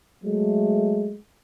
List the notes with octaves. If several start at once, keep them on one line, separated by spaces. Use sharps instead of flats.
F#3 G#3 A3